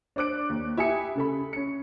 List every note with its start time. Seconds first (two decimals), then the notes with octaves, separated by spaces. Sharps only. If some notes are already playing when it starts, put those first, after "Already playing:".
0.16 D4 C5 D6 F#6 D7
0.50 D#2
0.77 E4 G4 G#5 D#6 C#7
1.15 C#3 A4 B5
1.53 C#4 C#7